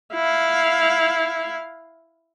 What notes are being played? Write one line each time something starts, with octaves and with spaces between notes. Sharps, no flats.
E4 F5